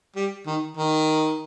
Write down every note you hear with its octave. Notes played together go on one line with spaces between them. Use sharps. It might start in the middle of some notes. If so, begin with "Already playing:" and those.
G3
D#3
D#3